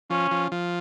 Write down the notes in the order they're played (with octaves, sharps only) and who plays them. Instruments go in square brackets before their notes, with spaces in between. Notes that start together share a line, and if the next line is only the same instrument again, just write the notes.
[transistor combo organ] F3 [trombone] C#4
[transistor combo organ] F3
F3